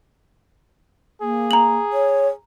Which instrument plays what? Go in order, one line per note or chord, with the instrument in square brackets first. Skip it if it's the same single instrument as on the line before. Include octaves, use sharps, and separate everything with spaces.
[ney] A#3 [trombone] G#4
[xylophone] A#5 F#7
[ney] C#5